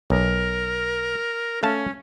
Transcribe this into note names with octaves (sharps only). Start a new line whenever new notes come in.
B1 A#4
A3 C#4 F5 A5